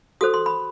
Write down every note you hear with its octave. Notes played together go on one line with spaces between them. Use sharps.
F#4 A4 C5 D#6
C6
B5